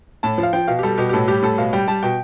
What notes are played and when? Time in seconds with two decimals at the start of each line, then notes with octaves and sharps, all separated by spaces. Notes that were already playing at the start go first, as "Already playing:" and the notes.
0.23 A2 A5
0.38 F3
0.43 F5
0.53 F3 G5
0.68 B2 F5
0.79 G4
0.83 G3 A4
0.98 B2 G4
1.09 G4
1.13 A2 A4
1.28 G3 G4
1.42 A2 A4
1.58 B2 F5
1.73 G3 G5
1.88 G3 A5
2.03 B2 G5